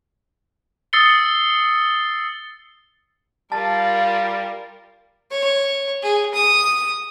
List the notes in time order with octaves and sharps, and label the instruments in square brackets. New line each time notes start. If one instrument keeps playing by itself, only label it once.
[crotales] D#6 E6 A6 C7 C#7 G7
[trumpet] G3 [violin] F4 A#4 [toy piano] A5 [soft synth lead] A6
[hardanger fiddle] C#5
G#4
D#6